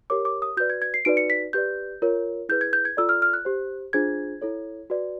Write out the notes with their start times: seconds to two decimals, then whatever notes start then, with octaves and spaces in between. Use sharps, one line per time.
0.10 G4 A#4 C#5 D6
0.25 D6
0.42 D#6
0.57 F#4 B4 D5 G6
0.70 G#6
0.82 G#6
0.94 C7
1.05 D#4 F#4 B4 D5 D7
1.17 C#7
1.30 B6
1.53 G4 B4 D5 G6
2.02 F4 A#4 C#5
2.49 E4 G#4 B4 G6
2.61 G#6
2.73 G6
2.85 G#6
2.97 F4 A4 D5 E6
3.09 F6
3.22 F6
3.33 F#6
3.45 G4 C5
3.93 D4 F4 G#4 C5 G#6
4.42 E4 A4 C#5
4.90 F#4 B4 D5